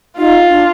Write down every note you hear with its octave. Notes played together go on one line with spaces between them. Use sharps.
D#4 F4
D4